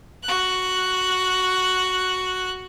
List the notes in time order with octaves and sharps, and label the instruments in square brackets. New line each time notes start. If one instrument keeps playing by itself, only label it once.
[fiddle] F#4 F#6